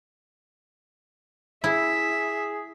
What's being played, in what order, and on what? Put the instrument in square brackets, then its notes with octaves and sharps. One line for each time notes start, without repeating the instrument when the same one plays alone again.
[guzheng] E4 [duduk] G#4 [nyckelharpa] E5